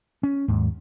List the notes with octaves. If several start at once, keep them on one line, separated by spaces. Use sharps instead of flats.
C#4
D#2 G#2